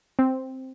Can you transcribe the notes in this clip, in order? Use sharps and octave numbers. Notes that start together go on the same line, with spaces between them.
C4